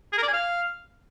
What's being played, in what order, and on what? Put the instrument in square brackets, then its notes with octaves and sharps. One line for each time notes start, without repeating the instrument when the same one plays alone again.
[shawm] G#4
A#4
D5
G#5
F5